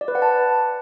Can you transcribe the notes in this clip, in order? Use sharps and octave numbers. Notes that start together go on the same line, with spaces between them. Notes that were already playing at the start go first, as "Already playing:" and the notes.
D5
B4
F#5
A5